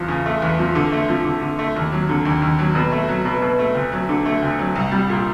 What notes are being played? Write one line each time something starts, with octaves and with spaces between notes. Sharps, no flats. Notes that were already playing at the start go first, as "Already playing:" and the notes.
Already playing: E2 F3
C#3
A3
E2
F3
D3
A3
F3
D3
D3
A3
D#2
F#3
D3
D#2
D#2
F#3
B2
A3
F#3
B2
B2
A3
D2
F#3
D3
A3
D2
F#3
C2
G3
A#2